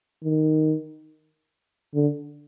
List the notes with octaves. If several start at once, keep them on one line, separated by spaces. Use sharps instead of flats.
D#3
D3